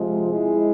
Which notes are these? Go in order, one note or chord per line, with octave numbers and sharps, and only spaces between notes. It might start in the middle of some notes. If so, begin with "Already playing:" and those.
Already playing: C3 F3 G#3
G#3 C4 E4